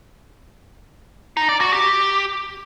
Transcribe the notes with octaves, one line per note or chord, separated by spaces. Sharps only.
D#4
D5
F#4
G4